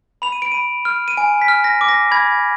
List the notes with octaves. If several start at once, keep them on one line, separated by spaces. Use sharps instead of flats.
B5 F7
D#7
D7
B5 D#7
F6
D#7
G#5 D7
B6
F6
A#6
D6
A#6
B5 G#6